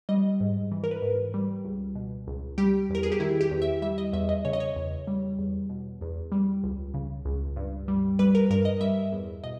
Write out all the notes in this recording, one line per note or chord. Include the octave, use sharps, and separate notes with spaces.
G3 D#5
G#2
E3
A#4
B4
G#2
G3
C#2
B2
C#2
G3 G4
E2 A#4
G#4
G4
D#3 E4
G4
E2
E5
G3 E5
D#5
E2 E5
D#5
C#3 C#5
D#5
C#5
E2
G3
E2
B2
E2
G3
C#2
C#3
C#2
G2
G3
G3 B4
A#4
G2 A#4
D#5
G3 E5
E2
B2 D#5